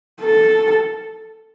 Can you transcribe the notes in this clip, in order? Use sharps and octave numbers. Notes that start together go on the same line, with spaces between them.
A4